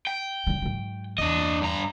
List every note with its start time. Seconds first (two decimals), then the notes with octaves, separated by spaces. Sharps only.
0.07 G5
0.47 C#3 G3
0.62 G#2 F#3
1.18 E2 D4 D#5
1.61 G2 A#5